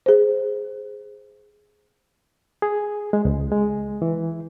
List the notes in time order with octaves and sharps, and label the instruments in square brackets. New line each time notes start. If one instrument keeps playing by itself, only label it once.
[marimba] G#4 C5
[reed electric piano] G#4
G#3
C#2
G#3
E3